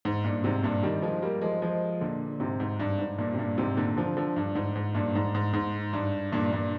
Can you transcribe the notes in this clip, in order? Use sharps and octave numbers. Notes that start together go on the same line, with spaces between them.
G#2
G2 A#2
G#2 C3
G2 A#2
D#3 G3
F3 G#3
G3 A#3
F3 G#3
F3 G#3
A#2 D3
G#2 C3
G#2
G2
G#2
G2 A#2
C3
G2 A#2
G#2 C3
A#2 D3
D3 F3
D3 F3
G2
G#2
G#2
G2 A#2
G#2
G#2
G#2
G2
G2 A#2
G2 A#2